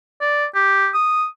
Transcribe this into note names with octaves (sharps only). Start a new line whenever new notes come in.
D5
G4
D#6